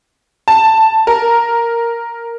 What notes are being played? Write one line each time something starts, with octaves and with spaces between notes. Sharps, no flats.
A5
A#4